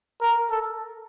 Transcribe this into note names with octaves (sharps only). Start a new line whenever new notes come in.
A#4
A4